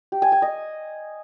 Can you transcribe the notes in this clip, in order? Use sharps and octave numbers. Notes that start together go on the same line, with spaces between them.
G4
G#5
G#5
D#5